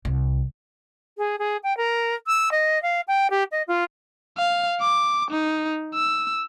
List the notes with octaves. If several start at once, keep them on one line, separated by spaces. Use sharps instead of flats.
C2
G#4
G#4
G5
A#4
E6
D#5
F5
G5
G4
D#5
F4
F5
D6
D#4
E6